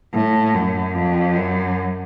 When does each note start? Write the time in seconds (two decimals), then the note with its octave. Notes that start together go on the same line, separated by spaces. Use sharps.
0.14 A2
0.55 F#2
0.96 F2
1.36 F#2